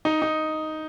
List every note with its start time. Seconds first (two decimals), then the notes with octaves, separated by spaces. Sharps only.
0.05 D#4
0.22 D#4